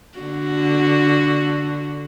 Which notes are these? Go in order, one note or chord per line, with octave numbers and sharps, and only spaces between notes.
D3 F#4